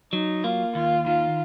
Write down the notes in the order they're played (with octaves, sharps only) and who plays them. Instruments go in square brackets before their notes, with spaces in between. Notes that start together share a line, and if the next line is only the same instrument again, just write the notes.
[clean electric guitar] F#3 [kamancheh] D#4
[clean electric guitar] A#3 [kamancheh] F4
[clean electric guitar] D#2 [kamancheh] F4
[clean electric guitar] D#3 [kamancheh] F4